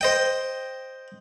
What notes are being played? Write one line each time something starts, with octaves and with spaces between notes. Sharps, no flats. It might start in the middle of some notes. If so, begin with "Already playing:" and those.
C5 D#5 G5